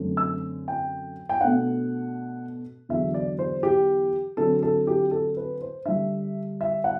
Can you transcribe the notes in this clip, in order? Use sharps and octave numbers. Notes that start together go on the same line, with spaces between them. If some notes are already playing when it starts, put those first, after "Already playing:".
Already playing: F#2 D3 A3 C4
E6
G5
G5
B2 A3 D4 F#5
E2 D3 F#3 E5
D5
C5
G4
D3 F#3 C4 A4
A4
G4
A4
B4
C5
D3 G3 D4 E5
E5
F#5